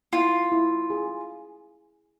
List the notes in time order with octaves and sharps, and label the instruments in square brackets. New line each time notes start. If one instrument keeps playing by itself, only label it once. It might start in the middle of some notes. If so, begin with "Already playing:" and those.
[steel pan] E4 [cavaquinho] F4
[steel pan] E4
G#4